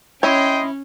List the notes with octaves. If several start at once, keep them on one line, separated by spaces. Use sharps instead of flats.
C#4 E4 C#5 D#5 G5 C6